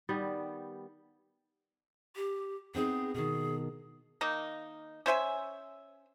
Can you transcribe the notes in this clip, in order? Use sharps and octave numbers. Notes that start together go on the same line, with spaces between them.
D#3 G3 B3
G4
B3 C4 D#4 G#4
B2 D#3 G#4
D#3 A#3 D#4
C#4 C5 E5 G#5